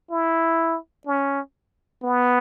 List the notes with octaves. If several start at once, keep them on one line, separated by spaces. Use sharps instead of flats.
E4
C#4
B3